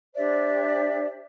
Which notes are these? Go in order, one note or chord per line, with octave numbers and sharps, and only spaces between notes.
D4 G4 C5 D5 E5